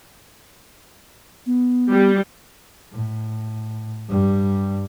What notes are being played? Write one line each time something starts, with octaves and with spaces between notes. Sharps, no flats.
B3
G3
A2
G2 G3